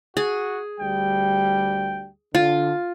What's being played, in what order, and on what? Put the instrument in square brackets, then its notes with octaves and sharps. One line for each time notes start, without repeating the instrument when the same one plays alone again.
[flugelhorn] F#4 [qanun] G#4
[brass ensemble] D2 G2 G3 [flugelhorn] G5
[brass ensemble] D3 [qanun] F4